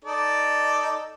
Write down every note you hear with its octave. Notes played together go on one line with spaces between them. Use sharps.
D#4 A4 D5